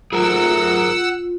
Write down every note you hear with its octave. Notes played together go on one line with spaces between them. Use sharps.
F#3 A3 F4 G#4 A#4 F#5 A#5 E6